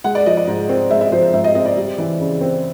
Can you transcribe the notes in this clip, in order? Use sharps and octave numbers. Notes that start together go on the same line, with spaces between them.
G#3 F#5
D5
F3 D#5
D5
G#2
C4
G#3 E5
E5
F3 C5
G#2 E5
D#5
C4 D#5
D5
G3
E3
C#3
C4